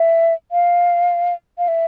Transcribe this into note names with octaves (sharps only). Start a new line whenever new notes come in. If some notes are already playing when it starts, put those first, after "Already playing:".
Already playing: E5
F5
F5
E5